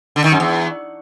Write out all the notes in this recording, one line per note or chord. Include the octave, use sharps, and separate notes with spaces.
D3
D#3
F#2
E2